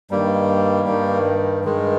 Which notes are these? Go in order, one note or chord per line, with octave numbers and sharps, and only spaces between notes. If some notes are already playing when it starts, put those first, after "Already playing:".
G2 D#3 G3 A#3
G2 D#3
G2 D#3 G#3